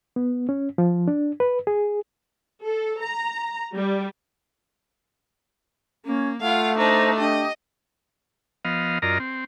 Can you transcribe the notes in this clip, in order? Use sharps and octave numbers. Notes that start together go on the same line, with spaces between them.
B3
C#4
F3
D4
B4
G#4
A4
A#5
G3
A#3 C#4
A3 F4 F5 F#5
D4 D#4 C5 A#5
D4 G4 D#5
F3 B3 D#5 F5
F#2 F4 A#4 D5 D#5 A#5
C4